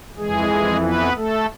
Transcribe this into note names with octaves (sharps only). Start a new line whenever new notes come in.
F2 E3 G#3 G#4
B3 B4
A3 A4